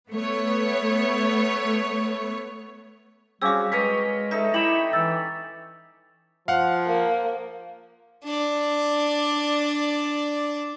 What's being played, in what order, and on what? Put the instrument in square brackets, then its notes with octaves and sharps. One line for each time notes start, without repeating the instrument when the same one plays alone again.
[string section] A3 B3 C#5
[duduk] G3 [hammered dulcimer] C4 C#4 [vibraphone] F#4 G#4 [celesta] F5 D6 E6
[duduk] G#3 [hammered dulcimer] A#4 C#5 D#5 [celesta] B4 B6 [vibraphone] C#6
[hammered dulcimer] D#4 A4 [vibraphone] E5
[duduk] E4 [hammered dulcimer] G4 C#5 [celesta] E7 F#7
[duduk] E3 [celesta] E6 A6
[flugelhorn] F3 [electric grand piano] F5 F#5
[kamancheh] A#3
[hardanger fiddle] D4 D5